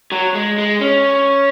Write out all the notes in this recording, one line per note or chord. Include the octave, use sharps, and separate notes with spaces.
F#3
G#3
G#3
C#4